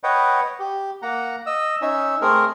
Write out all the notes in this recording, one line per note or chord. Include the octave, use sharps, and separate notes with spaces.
B4 C#5 D#5 F#5 G5
G4
A#3 F#5 A#5
D#5 E6
C#4 D#4 E5
A3 C4 G#4 A#4